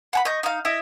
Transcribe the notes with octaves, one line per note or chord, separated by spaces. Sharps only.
F#5 G#5 B5
D#5 C#6 G6
D#4 F5
E4 D#5 E5